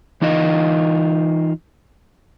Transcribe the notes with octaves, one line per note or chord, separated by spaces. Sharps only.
E3 D#4 F4 D#5